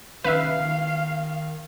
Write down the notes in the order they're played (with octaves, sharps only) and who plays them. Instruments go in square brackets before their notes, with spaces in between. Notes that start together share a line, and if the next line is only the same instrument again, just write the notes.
[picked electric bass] C2 D#3 C#4 [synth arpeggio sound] B4 E5 [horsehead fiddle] F5
[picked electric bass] D#3